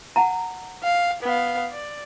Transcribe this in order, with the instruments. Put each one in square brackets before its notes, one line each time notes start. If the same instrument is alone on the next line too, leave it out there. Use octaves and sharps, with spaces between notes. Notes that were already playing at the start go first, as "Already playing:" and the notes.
[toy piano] F#5 A5 A#5
[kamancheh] F5
B3 F5
D5